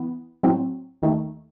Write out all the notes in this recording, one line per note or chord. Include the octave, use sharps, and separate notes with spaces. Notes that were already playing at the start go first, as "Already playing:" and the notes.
Already playing: E3 B3
A2 F#3 C4
D#2 D#3 A3